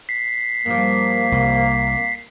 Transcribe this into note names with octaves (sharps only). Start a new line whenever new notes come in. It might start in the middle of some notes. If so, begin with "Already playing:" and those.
B6 C7
G2 F3 A#3
C2